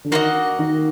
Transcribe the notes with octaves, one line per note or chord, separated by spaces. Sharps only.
D3
D#3 A#3 F#4 C5 D#5
D#3